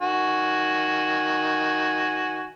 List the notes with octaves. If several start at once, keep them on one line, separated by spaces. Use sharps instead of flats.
D#3 F#4 G#5